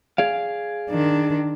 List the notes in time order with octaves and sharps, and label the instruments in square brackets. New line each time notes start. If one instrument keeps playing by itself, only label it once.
[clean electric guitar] G#4 D5 F5
[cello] D#3 D4